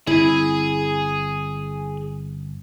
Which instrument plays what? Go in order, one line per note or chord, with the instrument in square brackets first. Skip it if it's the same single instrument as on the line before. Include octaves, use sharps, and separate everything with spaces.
[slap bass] G1 B2 C4 [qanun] E4 [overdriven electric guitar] G#4 G#5